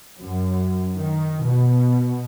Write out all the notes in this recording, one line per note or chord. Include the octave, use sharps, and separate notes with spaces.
F#2
D#3
B2